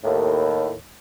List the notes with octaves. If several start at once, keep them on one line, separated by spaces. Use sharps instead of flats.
D#2 A2